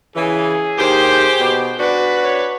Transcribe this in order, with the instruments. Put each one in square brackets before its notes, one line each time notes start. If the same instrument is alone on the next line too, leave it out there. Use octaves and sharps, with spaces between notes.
[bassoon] C#3 [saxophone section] E3 [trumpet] G#4
[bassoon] D#2 [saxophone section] G4 [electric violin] C5
[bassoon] B2
[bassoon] D4 [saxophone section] F#4 [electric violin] B4
[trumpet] C#5